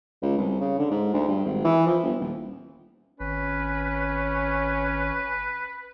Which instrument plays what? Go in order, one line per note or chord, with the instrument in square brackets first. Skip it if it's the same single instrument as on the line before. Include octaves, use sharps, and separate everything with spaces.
[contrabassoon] C#2
C2
C#3
D3
G#2
D2
G2
G#1
E3
F3
G1
D#1
[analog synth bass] G#1 [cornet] C#4 [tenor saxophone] B4